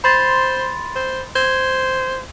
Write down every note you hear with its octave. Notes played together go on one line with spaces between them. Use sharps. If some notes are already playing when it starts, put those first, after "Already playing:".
C5 B5 C6 A6
C5
C5 G#6